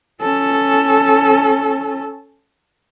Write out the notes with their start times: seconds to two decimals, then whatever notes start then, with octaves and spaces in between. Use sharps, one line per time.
0.22 C#4 A4